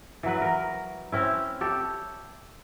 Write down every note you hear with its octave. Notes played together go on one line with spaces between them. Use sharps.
E3 F#3 B4
A#4
C4 C#4 E4
G4 A4 C#5